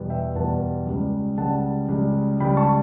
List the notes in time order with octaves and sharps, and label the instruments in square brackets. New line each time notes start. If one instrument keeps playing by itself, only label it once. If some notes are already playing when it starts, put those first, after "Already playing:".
Already playing: [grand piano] E2 B2 G3 B3
E5 G5
E2 B2 G3 B3 F#5 A5
C#2 C#3 G3
C#2 C#3 G3 F#5 A5
C#2 C#3 G3
C#2 C#3 G3 G5 B5
A5 C#6